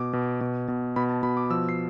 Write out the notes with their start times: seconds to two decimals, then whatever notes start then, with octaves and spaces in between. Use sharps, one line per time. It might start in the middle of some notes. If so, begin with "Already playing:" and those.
Already playing: B2 D6
0.13 B2
0.41 B2
0.68 B2
0.96 B2 B5
1.09 A5
1.23 B2 B5
1.37 D6
1.50 F3 E6
1.69 C7